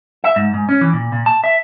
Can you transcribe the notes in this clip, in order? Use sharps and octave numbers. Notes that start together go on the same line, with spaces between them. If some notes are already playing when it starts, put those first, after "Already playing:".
E5
G#2
G#2
C#4
E3
A#2
A#2
A5
E5